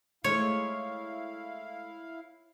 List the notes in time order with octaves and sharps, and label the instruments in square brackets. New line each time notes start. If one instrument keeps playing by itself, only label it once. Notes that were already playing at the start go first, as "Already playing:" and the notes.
[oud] G#3 A3 [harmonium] E4 F5 [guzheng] C#5